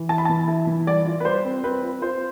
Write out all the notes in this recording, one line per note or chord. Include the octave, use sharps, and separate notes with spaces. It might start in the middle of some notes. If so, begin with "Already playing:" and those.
Already playing: E3
E4 A5
B5
E3 A5
E4
E3
G3 D5
F4
B4
G3 C5
C4
C4 B4
F4
F4 C5